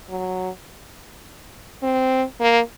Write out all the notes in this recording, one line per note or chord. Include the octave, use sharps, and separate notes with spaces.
F#3
C4
A#3